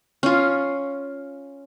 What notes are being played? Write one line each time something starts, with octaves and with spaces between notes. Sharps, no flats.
C#4 F4